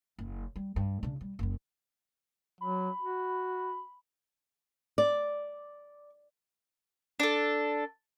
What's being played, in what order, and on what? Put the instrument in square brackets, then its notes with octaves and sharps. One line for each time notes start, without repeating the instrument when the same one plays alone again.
[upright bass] F#1
G3
G2
C#3 D4
G3
F#1 F#2
[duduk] F#3 [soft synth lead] B5
[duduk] F#4
[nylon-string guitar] D5
[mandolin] D4 A4